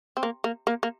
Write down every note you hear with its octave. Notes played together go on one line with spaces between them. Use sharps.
C4
A#3
A#3
A#3
A#3